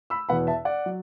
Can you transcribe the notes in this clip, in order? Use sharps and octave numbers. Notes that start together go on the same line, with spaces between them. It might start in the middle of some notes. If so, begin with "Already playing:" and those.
B5 E6
E2 B2 B3 F#5 B5
E5 A5
D5 F#5
F#3